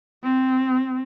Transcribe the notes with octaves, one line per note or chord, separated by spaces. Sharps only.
C4